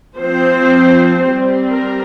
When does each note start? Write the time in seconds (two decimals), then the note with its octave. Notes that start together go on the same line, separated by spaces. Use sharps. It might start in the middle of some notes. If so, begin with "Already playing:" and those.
0.17 F3 C4 C5
1.20 G3 C4
1.71 A#4